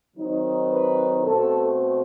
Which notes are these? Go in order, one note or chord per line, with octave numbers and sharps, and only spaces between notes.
D#3 F#3 C4 D#4
B4
B2 A3 C4 A4